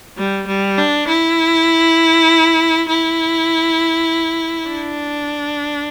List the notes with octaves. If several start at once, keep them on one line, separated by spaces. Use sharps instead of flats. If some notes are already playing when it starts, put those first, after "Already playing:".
G3
G3
D4
E4
E4
D4